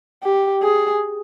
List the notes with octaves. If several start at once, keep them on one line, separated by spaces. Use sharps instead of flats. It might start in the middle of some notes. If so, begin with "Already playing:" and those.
G4
G#4